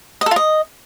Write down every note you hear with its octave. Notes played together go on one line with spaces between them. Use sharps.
D#5
A4
F4
D#5